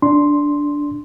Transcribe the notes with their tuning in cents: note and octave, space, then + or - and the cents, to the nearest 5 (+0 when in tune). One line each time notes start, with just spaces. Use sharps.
D4 -10 C6 +0